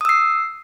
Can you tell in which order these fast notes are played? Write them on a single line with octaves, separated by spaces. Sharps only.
D#6 E6 C7